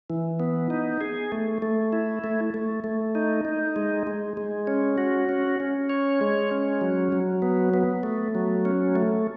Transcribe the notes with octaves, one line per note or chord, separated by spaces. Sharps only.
E3
B3
D#4
G#4
A3
A3
E4
A3
A3
A3
D#4
D#4
G#3
G#3
G#3
C#4
F#4
C#4
C#4
C#5
G#3
C#4
F#3
F#3
B3
B3
A3
F#3
C#4
A3